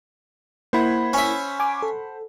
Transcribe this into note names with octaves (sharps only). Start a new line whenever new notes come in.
A#3 E4 C5 F#5 B5 G#6
C#4 E5
G#5 D6
A4